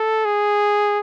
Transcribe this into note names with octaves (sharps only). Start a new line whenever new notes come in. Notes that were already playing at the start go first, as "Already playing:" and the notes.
Already playing: A4
G#4